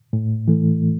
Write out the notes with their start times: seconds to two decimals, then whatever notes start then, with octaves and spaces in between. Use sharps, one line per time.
0.13 A2
0.48 E3 A3